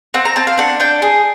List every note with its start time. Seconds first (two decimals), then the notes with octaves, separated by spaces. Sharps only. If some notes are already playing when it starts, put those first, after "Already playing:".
0.14 C4 F#5
0.25 A#5
0.36 C4 A5
0.47 F5
0.58 D4 F#5
0.80 D4 G5
1.02 G#4